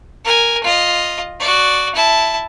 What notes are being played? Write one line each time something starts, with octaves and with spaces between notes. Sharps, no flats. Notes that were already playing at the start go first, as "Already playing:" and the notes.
A#4 G#5
F4 D#5
F#4 D5
E4 A5